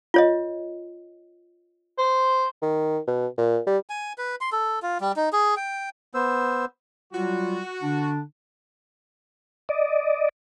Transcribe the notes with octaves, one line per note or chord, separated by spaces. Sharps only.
F4 C#5 D#5
C5
D#3
B2
A#2
G3
G#5
B4
C6
A4
F4
G3
D#4
G#4
G5
B3 C5 E6
F#3 G3 F4 F#4
D3 D4
D5 D#5